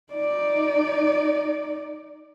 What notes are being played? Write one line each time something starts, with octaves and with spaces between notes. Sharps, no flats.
D#4 D5